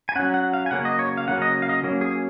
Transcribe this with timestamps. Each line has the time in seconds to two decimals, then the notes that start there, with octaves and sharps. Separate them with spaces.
0.09 G#5
0.15 F#3 C#4 F#5
0.34 F#5
0.54 F5
0.66 G#5
0.71 C#3 F#3 A#3 C#4 F#5
0.85 D#5
0.99 C#5
1.17 F5
1.27 C#3 F#3 A#3 C#4 F#5
1.42 D#5
1.62 F5
1.69 D#5
1.83 F#3 A#3 C#4
2.01 G#4